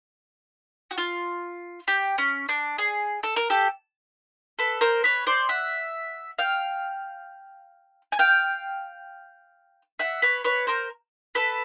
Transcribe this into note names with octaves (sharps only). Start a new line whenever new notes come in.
F#4
F4
G4
C#4
D4
G#4
A4
A#4
G4 A4
A4 B4
A#4 C5
B4 C#5
C5 D5
E5 F#5
F5 G5
G#5
F5 G5
E5 F#5
B4 C#5
B4 C#5
A#4 C5
A4 B4